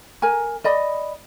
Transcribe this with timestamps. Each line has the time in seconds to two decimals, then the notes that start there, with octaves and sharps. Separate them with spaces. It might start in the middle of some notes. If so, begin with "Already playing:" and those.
0.22 A#4 G#5
0.64 D5 D#5 B5